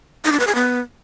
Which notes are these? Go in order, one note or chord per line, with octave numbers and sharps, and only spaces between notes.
D#4
D4
B4
G#4
B3